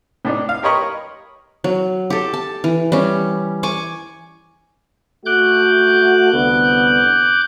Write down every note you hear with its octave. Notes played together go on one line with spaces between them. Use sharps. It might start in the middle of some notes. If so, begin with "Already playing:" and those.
A2 D4 D#4
F5
G4 A#4 C#5 D#5 B5 C#6
F#3
G4 A4
A5
E3
G3 C#4
G#5 C#6 D6
A3 F#4 D6 F#6 G6
C2 D3 B3